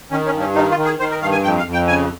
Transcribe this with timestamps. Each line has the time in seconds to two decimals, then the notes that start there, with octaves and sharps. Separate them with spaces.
0.11 D#3 C#4
0.26 C#4
0.34 G2
0.40 C#4
0.55 D#3 D#4
0.70 F4
0.77 D#3
0.85 G#4
0.99 D#3 C5
1.11 A#4
1.21 G2 F5
1.32 G#5
1.43 F2 G5
1.58 F5
1.66 F2
1.73 G5
1.88 C#3 G#5